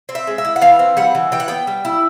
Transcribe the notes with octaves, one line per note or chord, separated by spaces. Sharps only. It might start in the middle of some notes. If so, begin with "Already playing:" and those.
C4
E5
G#3
E5
E4
F#5
E3 F5
C4
G3 F#5
E3
E3 G5
F#5
B3 G5
G3
E4